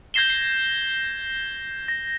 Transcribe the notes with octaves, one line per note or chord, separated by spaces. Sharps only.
G6 G#6 A#6 C7 E7 G7
C7
A#6